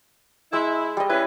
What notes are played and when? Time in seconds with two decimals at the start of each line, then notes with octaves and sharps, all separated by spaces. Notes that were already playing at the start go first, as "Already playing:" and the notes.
0.53 G#3 E4 E6
0.97 G3 D#5
1.10 C#4 E4 B4